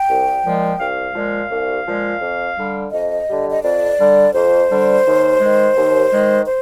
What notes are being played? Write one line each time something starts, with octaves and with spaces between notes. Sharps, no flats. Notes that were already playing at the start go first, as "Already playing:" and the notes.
Already playing: G5
C2
A#2 F3 G#3
C2 F5
A#2 F3 G#3
C2
A#2 F3 G#3
F2
D3 G3
F2 D#5
D3 G3
D#5
F2 D5
D3 G3
F2 C5
D3 G3
D#2
D#3 G#3
D#2
D#3 G#3
C5